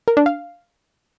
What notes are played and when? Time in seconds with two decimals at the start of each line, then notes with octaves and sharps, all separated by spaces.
0.08 A#4
0.17 D4
0.26 F5